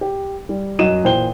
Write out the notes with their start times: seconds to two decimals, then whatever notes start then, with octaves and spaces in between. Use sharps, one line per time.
0.01 G4
0.49 G3
0.79 F#2 F#3 F#4 D#5 D#7 E7
1.04 A#2 E3 C5 G5 G7